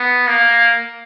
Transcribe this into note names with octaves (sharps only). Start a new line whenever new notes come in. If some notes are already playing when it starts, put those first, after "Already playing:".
Already playing: B3
A#3